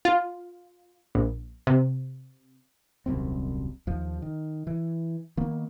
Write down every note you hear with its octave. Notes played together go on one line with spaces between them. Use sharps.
F4
A#1
C3
D#1 C2 F#2 C4
D#2 F3
D#3
E3
D#3 A#3 B3